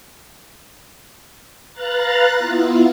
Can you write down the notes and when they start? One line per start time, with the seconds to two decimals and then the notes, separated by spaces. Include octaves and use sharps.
1.73 B4 F5 A#5 F#6 A6
2.37 B3 E4 F4